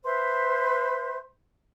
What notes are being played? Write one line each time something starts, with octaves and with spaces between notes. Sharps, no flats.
B4 C5 E5 C6